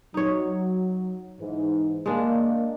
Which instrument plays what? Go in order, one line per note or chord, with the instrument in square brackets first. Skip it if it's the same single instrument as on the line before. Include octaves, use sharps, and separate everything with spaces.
[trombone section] F#3 [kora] D#4 C#5
[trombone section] G#2 E3
[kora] G#3 D4 [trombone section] A#3